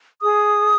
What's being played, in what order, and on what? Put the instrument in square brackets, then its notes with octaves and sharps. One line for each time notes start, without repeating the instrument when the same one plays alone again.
[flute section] G#4 D#6